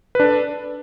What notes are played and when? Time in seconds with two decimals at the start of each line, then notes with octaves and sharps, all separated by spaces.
0.15 B4
0.20 D4
0.24 A4